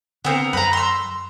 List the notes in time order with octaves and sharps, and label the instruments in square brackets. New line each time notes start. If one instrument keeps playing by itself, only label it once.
[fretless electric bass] D3 [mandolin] B3 C4 A#4
[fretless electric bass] F#2 [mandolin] B4 A#5
[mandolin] C6 E6